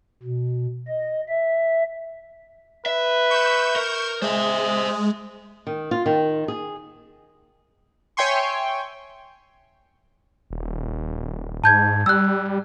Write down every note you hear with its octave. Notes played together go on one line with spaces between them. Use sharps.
B2
D#5
E5
B4 E5
C#6 G6 E7
A#4
G#3 C5 E5 D#6
D#3
F4
D#3
G#4
C#5 E5 G5 G#5 C6 C#6
D#1
G#2 A5 G6 G#6
G3 E6 F#6